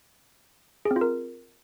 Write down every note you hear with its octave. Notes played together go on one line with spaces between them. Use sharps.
G#4
C4
F4
A#4